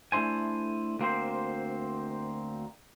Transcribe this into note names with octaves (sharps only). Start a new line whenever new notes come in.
A3 D4 E4 C5 G#5
D2 A#3 C4 C5